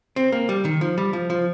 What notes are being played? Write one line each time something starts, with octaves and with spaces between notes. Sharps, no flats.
C4
A#3
G3
D#3
F3
G3
F3
F3